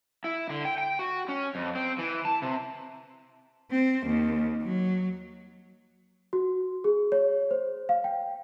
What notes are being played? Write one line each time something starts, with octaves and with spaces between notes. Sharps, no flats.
E4
D3
G5
G5
F#4
C#4
F2
C4
E3
A5
C3
C4
D#2
F#3
F#4
G#4
C#5
C5
F5
G5